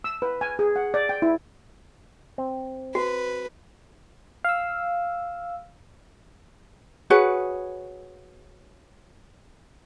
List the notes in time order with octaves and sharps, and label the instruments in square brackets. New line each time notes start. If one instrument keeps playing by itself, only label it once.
[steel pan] E6
B4
G#5
G#4
F#5
D5
G5
E4
[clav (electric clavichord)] C4
[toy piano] F#4 [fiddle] B4
[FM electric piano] F5 E6
[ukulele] F#4 G#4 B4 C#5